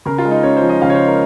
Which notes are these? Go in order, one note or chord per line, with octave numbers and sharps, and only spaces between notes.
C#3 A#4
F4
G#3
D#4
C#4 C#5
C5
F3
D#5
C#3 F5
C#5
C5
G#3
A#4